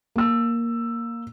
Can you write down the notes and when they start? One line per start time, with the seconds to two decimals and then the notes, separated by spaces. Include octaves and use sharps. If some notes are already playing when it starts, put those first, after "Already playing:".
0.16 A#3 E6